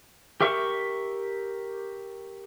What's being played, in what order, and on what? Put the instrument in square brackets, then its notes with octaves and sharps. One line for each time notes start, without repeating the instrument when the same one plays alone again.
[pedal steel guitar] G4 A#4 E5 C#6